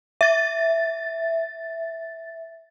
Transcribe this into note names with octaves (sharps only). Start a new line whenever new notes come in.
E5 A6